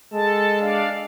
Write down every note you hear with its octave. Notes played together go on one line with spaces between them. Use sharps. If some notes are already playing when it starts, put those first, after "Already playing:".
G#3 A4 A5
D4 D5 F5